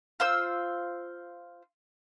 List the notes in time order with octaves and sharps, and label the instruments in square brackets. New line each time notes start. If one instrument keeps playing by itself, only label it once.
[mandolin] F4 C5 E6